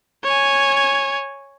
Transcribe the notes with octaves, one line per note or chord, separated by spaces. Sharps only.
C#5 G#5